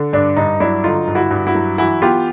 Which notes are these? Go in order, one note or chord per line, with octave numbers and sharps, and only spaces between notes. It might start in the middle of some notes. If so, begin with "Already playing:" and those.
Already playing: D3
G2 D4
G2 D#4
F#3 D4 E4
D3 D#4 F4
G2
E4 F#4
G2
E4 F#4
F#3
E3 E4 F#4
B3 F4 G4